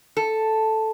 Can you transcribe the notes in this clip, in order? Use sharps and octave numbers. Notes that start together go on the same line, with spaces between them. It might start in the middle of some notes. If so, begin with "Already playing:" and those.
A4